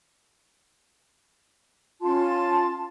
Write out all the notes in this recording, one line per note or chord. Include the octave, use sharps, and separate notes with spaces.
C#4 F4 A5 C6